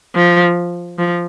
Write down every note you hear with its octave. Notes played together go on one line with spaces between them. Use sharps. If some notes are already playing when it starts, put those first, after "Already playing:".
F3
F3